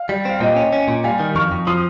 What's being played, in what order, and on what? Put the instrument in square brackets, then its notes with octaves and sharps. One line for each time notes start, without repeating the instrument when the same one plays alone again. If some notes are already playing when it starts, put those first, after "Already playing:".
Already playing: [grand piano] F5
[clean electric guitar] G3
[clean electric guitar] C4 [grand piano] F5
[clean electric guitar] A#2 [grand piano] D#5 G5
[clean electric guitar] C#4
C#4
A#2
[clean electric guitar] G3 [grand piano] F5 G#5
[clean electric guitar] D#3
[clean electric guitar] F2 [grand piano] C#6 F6
[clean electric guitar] F2
[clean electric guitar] F3 [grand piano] C6 D#6